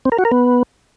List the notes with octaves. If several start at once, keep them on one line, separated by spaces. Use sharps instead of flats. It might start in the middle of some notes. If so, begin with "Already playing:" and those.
C4
A#4
F#4
A#4
B3